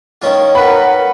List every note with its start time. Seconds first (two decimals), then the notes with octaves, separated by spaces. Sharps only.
0.22 D#3 C#4 F4
0.55 A#4 B4 F#5 B5